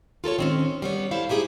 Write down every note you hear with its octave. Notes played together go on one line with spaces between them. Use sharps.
F4 A4 A#4 C#5
D#3 C4 C#4
G3 B3 C#5
E4 A4 C5 F5
D#4 E4 G4 G#4